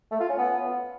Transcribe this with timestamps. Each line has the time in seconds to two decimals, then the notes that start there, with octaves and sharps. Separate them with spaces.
0.11 A3
0.20 F4
0.29 C#4
0.38 B3